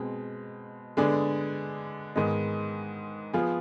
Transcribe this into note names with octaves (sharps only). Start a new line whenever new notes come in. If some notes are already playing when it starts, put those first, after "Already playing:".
Already playing: B2 G#3 C4
D3 G#3 B3 D4 G#4
G#2 D#3 G#3 B3 D#4
F3 B3 F4 G#4